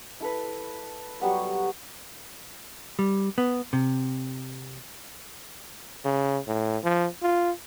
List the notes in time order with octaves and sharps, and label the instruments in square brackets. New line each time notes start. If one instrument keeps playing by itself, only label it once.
[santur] E4 A4 B4
F#3 G3 B3 C#6
[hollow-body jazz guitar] G3
B3
C3
[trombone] C#3
A2
F3
F4